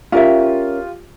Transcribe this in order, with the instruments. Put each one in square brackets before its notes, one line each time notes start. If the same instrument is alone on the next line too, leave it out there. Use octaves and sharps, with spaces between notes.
[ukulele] C#4 A#4 E5 [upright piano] F4 G4